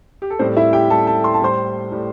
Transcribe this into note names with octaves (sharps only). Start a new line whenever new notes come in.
G4
A4
A2 G3 C4 C5
E4 E5
G4 G5
A2 G3 A4 A5
A4 A5
C6
A5
A2 G3 C5 C6
A2 G3